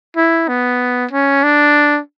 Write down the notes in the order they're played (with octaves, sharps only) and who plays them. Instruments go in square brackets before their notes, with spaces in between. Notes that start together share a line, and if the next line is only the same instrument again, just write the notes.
[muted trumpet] E4
B3
C#4
D4